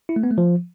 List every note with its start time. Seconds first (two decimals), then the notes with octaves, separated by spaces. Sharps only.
0.09 E4
0.16 A3
0.23 B3
0.31 A3
0.38 F3